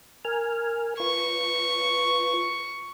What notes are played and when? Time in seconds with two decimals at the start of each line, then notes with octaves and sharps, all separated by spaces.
0.25 A#4 G#5 F6
1.00 F4 B4 C#6